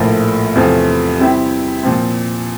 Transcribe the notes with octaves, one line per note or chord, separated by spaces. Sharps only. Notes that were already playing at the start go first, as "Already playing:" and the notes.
Already playing: A#1 A2 F3 A#3
E2 C3 F3 A3 C4
C3 G3 C4 E4 G4
A#2 F3 C4